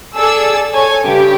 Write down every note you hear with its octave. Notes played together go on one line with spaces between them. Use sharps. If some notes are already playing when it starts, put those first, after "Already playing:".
G#4 A4 D5 E6
A4 C#5 G#5
G2 C#3 G4